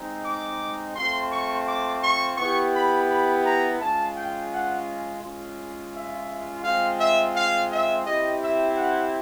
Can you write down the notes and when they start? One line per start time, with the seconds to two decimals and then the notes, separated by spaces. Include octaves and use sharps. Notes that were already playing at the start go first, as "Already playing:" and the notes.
Already playing: G#3 C4 D#4
0.25 D6
0.95 A3 C4 F4 C6
1.31 C#6
1.67 D6
2.02 C#6
2.37 B3 E4 G4 C#6
2.73 B5
3.08 B5
3.44 A#5
3.79 G#3 C#4 F4 A5
4.14 G5
4.50 F#5
5.21 G#3 C#4 F4
5.92 E5
6.63 G#3 C4 F4 F5
6.99 E5
7.34 F5
7.70 E5
8.05 C4 E4 G4 D#5
8.41 E5
8.76 F#5